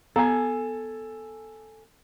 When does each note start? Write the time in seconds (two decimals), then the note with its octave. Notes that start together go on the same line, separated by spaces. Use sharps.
0.16 B3 A4 F5 G#5 A#5